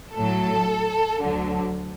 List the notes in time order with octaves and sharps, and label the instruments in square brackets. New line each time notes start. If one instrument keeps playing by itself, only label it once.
[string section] A2 F#3 A4
D2 D3 F#3